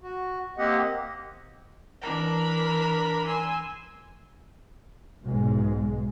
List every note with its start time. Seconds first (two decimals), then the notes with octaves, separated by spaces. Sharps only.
0.02 F#4
0.58 A#3 C4 G4 D#5 F#5
2.02 E3 D4 A#4 B5
3.26 G#5 C6 E6
5.23 B1 G#2 G#3